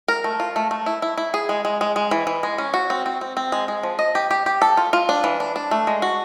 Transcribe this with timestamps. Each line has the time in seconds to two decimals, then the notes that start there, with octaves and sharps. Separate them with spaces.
0.08 A#4
0.24 A3
0.40 F4
0.56 A3
0.71 A3
0.86 E4
1.02 E4
1.18 E4
1.34 G#4
1.49 G#3
1.65 G#3
1.81 G#3
1.96 G#3
2.11 E3
2.27 E3
2.43 G#3
2.58 C#4
2.74 F#4
2.90 C4
3.06 C4
3.21 C4
3.37 C4
3.52 G#3
3.68 G#3
3.83 F3
3.99 D#5
4.15 G4
4.31 G4
4.46 G4
4.62 A4
4.77 F4
4.93 F4
5.09 D4
5.24 E3
5.40 D4
5.56 D4
5.71 A3
5.87 G#3
6.02 F#4